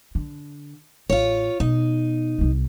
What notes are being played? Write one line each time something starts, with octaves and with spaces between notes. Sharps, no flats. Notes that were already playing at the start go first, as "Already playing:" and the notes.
D3
A1 F4 C#5
B2 D#4
C2 C4